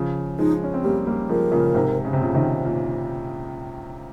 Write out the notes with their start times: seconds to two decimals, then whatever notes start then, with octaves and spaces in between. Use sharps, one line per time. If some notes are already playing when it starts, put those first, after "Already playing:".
Already playing: C#3 F3
0.39 F3 G#3 D#4
0.63 C#4
0.74 C4
0.83 G3 A#3 G4
1.07 G3 A#3
1.29 F3 G#3 A#4
1.52 A#2 C#3
1.74 G#2 C3
2.05 C#3
2.13 C3
2.21 A#2 C#3
2.34 C3 D#3
2.65 A#2